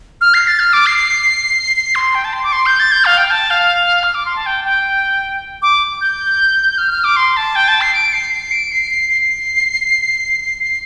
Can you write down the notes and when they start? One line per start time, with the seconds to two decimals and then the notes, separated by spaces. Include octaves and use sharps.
0.21 F6
0.34 C7
0.48 A6
0.59 F6
0.73 D6
0.86 C7
0.98 C7
1.76 C7
1.95 C6
2.15 G5
2.25 A5
2.33 C6
2.44 D6
2.53 C6
2.66 G6
2.80 A6
2.92 G6
3.05 F5
3.17 G5
3.31 A5
3.50 F5
4.04 F6
4.15 D6
4.25 C6
4.36 A5
4.46 G5
4.65 G5
5.62 D6
6.01 G6
6.78 F6
6.91 F6
7.04 D6
7.16 C6
7.37 A5
7.56 G5
7.68 A5
7.81 C7
7.94 D7
8.13 C7
8.33 C7
8.51 D7
8.72 C7
8.91 C7
9.10 C7
10.64 C7